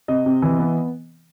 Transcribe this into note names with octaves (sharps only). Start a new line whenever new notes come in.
C3 D#5
C3
E3
B3